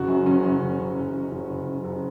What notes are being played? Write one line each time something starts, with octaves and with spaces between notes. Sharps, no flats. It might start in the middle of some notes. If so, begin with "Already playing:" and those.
Already playing: F#1 F#4
F#2
F#1 C#4
F#2
F#1
F#1
F#1
F#1
F#1
F#1
F#2
F#1